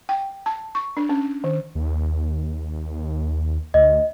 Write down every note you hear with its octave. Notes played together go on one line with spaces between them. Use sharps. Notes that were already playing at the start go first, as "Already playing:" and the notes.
G5
A5
C#6
D4
C#4
D#3
D#2
D2 D#5